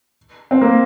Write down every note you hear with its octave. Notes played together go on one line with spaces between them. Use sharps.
C4
A#3